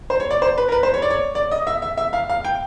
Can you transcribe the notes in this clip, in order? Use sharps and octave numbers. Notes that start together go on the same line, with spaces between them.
C5
C#5
D5
C5
B4
A#4
B4
C5
C#5
D5
C#5
D5
D#5
E5
E5
E5
F5
F5
G5